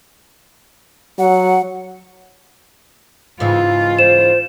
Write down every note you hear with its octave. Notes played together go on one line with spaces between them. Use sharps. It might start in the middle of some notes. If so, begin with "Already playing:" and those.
F#3 F#5
G#2 C#3 E3 F4
C5 E7